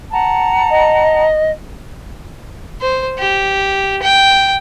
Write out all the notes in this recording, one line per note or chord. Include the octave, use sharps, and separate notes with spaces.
F#5 A5 A#5
D#5
C5
G4
G5